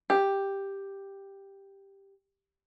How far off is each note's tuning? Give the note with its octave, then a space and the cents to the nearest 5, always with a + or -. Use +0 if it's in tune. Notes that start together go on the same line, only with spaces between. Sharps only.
G4 +5